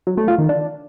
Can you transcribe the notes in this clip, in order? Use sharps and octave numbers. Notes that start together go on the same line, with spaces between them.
F#3
A3
F4
D#3
D4